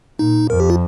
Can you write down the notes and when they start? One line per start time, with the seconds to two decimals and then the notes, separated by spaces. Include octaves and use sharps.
0.19 A#2 D#4
0.50 F2 A#4
0.60 G4
0.70 F4